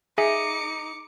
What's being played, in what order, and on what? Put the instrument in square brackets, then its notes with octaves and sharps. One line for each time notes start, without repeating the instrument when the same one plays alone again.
[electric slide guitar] D#4 [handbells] G#4 E5 G#5 [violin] D6 C#7